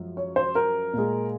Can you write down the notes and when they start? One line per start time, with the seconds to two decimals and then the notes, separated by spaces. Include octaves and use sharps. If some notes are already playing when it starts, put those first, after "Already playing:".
Already playing: F#2 F3 G#3
0.17 C#5
0.36 C5
0.55 A#4
0.93 A#2 G#3